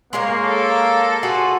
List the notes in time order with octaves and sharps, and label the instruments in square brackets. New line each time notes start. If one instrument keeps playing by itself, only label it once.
[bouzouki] G#3 G#4 C#5 [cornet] A#3
[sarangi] A4
[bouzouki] F4 F#4 G#4